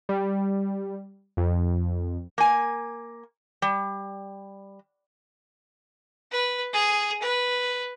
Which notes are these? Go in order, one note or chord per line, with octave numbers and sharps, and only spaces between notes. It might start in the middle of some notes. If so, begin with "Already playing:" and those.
G3
F2
A#3 G#5
G3
B4
G#4
B4